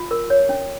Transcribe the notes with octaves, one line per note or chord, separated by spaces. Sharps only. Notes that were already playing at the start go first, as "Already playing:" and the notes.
Already playing: F4
A#4
C#5
C#4